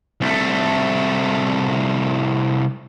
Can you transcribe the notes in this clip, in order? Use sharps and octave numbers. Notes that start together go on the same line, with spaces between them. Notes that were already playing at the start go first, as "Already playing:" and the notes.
C2 A3